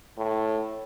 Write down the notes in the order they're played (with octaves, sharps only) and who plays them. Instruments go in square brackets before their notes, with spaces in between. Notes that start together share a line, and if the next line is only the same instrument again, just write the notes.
[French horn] A2